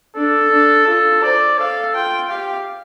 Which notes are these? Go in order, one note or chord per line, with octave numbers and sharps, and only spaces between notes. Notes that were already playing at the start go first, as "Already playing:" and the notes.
D4 A4
D4
F4 A4
C5 D5
A4 F5
F4 G5
G4 F5